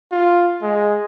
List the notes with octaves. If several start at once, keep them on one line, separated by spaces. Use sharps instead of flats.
F4
G#3